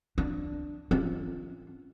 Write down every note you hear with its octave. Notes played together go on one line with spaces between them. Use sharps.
D4
C#4 F4